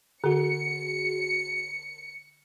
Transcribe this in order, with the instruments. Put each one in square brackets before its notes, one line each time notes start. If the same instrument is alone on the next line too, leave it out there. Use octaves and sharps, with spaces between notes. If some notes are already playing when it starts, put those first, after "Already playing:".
[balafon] D3 [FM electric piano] F#4 G#4 [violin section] C#7